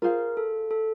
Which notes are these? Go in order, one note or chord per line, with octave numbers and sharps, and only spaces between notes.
F4 G#4 A#4 C5 F5
A4
A4